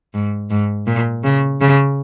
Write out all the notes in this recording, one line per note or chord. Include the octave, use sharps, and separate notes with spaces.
G#2
G#2
A#2
C#3
C#3